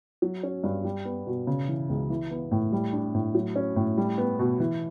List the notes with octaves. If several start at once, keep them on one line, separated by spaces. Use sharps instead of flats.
F#3
C#4
G2
G3
B3
B2
C#3
E3
C#2
E3
B3
A2
G3
D4
A2
F#3
C#4
A2
G3
B3
B2
E3